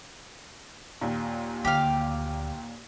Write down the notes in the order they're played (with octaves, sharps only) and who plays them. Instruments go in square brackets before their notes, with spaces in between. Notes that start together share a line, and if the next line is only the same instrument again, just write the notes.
[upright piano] D#2 A#2
[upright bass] D2 [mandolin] G4 F5